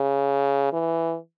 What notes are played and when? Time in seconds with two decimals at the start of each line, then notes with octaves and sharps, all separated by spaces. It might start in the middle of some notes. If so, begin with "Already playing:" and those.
Already playing: C#3
0.73 E3